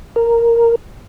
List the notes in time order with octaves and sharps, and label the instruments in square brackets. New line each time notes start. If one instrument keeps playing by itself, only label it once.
[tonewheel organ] A#4